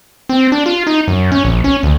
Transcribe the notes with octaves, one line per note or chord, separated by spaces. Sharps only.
C4
D4
F4
D#4
F#2
C#4
A#1
C#4
D2